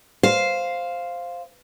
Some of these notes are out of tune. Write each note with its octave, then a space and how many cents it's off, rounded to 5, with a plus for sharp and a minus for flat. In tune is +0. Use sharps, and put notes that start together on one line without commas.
C5 +0 F5 +0